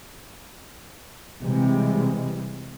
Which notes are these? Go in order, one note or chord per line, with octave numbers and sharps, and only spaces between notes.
C3 E3 G3 G#3